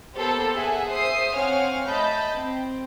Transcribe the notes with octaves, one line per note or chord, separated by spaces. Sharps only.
A#3 B3 G4 A4 C5
G#4 E5 F#5 G#5
C5 E5 D#6 C7
C4 C#5 F5 F#5 G#5 F6
A3 D#5 A5 B5 G6
C4